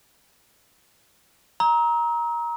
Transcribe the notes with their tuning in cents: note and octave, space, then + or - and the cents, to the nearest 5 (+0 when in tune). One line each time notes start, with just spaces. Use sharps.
A#5 +15 E6 -45